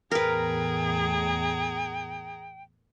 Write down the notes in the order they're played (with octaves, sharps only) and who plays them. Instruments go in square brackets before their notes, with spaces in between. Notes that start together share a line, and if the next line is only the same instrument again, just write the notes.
[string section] E2 A2 [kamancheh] G#4 A#5 [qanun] A#4 B4 [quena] G5